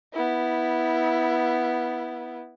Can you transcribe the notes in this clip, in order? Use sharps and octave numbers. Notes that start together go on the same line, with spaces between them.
B3 E4